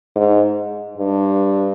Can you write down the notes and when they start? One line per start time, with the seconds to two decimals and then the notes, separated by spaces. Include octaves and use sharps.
0.16 G#2
0.98 G2